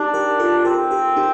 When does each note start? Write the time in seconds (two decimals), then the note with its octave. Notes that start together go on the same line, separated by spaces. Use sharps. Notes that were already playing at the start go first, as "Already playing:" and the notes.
Already playing: D4 D#4 G4
0.14 G4 A#4
0.40 F4 A4
0.65 C4 G4 A#4
0.91 G4 A#4
1.17 D#4 G4